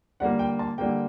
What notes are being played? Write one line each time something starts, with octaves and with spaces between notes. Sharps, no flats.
D3 G3 A#3 F#5
G5
A5
D3 G3 A#3 G5